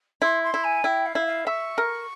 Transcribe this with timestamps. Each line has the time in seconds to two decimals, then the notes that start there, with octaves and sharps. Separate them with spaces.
0.22 E4 C6
0.43 C6
0.54 E4
0.63 G#5
0.84 E4 G5
1.05 F5
1.15 E4
1.26 F5
1.47 E5 C#6
1.78 A#4